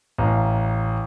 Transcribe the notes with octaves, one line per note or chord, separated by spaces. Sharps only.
A1 F5 A#5